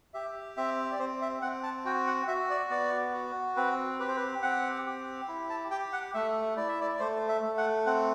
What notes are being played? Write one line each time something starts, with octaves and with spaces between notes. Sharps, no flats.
G4 E5
C4 E5
D5
C4 C5
E5
C4 F#5
A5
F#4 G5
F#5
F#4 E5
D5
B3 D5
F#4
C4 B4
G4 B4
C5
B4
C4 F#5
G4
E4
A5
G4 G5
F#5
A3 E5
E4 D5
E5
D5
D5
A3 C5
E5
A3
F#5
C4 F#5